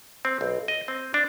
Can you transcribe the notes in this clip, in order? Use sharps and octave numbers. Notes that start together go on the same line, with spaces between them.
C4
B1
D#5
C4
D4